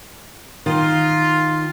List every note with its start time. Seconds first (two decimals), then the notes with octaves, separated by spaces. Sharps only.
0.66 D#3 F4